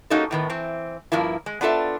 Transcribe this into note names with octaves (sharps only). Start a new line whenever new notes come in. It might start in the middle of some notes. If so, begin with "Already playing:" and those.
A#3 C#4 D#4 F#4 G4 A4
A2 D#3 B3
E3 C4
G2 F3 A#3 E4
G#3
B3 D4 F4 A4 E5